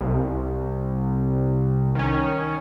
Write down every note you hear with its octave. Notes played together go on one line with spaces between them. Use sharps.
C2
D#3 C#4